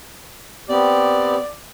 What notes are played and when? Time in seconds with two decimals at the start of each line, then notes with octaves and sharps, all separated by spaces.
0.69 B3 C4 G4 D5